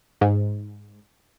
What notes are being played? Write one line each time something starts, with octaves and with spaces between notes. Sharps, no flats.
G#2